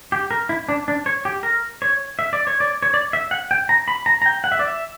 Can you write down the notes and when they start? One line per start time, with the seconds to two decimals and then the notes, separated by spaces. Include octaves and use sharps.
0.12 G4
0.31 A#4
0.49 E4
0.69 D4
0.88 D4
1.06 C#5
1.25 G4
1.43 A#4
1.82 C#5
2.19 E5
2.33 D5
2.47 C#5
2.60 D5
2.83 C#5
2.94 D5
3.13 E5
3.31 F#5
3.51 G5
3.69 A#5
3.88 B5
4.06 A#5
4.22 A#5
4.26 G5
4.44 F#5
4.52 E5
4.59 D5
4.68 E5